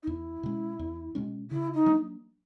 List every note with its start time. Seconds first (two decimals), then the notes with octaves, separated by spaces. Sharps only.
0.03 D#4
0.07 E2 E4
0.43 B2 G#3 C#4
0.79 E2
1.15 B2 G#3 C#4
1.51 C#3 E4
1.74 D#4
1.86 F#3 A#3 D4